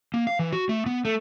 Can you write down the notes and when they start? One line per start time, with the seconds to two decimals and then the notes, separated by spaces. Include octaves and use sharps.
0.14 A#3
0.27 F5
0.39 E3
0.53 F#4
0.69 A3
0.86 B3
1.05 A3